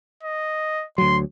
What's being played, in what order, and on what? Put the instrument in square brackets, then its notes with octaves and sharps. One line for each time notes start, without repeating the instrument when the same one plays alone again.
[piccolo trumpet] D#5
[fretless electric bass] D2 F#3 [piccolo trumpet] C6